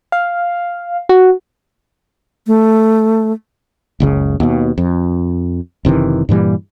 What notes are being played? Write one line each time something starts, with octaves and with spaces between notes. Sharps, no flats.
F5
F#4
A3
F#1 C#2 C#3
D#2 B2
F2
F#1 C3 D#3 E3
G2 A#2 E3 G3